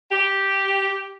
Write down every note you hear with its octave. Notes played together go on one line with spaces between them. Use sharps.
G4